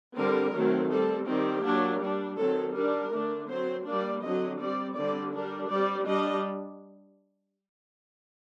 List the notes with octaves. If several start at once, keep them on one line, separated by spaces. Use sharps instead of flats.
D3 G3 C4 A#4
D#3 F#3 A3 C4
G3 C4 A4
D#3 G3 C4 G4
F#3 A#3 D4
G3 D4
D#3 F#3 C4 A4
G3 D4 A#4
D3 A3 D4
F#3 C4 C5
G3 A#3 D4 D5
D3 F#3 C4 D#5
G3 C4 D5
D3 G3 C4 D5
G3 D4 A#4
G3 C4 D5
G3 D4 D#5